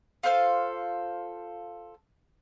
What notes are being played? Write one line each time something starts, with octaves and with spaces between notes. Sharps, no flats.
F4 A4 C5 F5